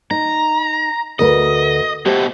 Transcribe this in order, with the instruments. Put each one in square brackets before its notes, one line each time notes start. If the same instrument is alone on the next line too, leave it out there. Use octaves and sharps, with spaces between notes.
[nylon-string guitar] D#4 [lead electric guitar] A#5
[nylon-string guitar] D2 A#4 B4 [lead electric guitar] D#5
[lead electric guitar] B2 A3 [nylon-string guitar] G4 C5